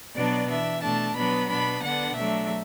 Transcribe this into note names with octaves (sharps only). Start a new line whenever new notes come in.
B2 F#3 B3 D4 D5
E3 D4 E5
B2 A3 D4 A5
B2 F#3 B3 D4 B5
B2 B3 D4 B5
D3 B3 D4 F#5
B2 F#3 A3 D4 E5